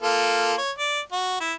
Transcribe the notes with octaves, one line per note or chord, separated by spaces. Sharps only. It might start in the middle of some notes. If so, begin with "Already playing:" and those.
A#3 F4 A4
C#5
D5
F#4
E4